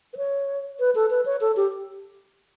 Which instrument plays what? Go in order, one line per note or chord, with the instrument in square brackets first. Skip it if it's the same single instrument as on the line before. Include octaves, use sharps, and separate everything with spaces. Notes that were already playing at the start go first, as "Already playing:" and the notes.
[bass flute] B4
C#5
B4
A4
B4
C#5
A4
G4